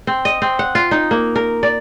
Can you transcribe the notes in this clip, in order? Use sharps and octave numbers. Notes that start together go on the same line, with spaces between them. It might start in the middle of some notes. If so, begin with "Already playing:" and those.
C4
D#5
C4
F#5
F4
D#4
A#3
A#4
D5